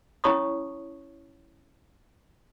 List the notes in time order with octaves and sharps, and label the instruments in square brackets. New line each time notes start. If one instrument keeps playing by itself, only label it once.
[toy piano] C#4 E4 C#5 A5 C#6 D#6